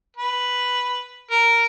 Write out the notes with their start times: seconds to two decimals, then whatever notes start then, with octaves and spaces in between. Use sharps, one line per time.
0.17 B4
1.31 A#4